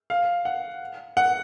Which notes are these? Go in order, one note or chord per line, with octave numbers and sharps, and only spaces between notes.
F5
F#5
F#5